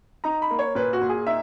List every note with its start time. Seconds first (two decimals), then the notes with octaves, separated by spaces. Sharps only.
0.24 D#4 A#5
0.42 B5
0.51 A#3
0.59 C#5
0.75 A#2 B4
0.93 F#4
1.01 A#2
1.09 G#4
1.27 D#4 E5